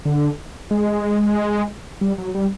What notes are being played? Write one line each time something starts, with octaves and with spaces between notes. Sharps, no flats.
D3
G#3
G3
F#3
G3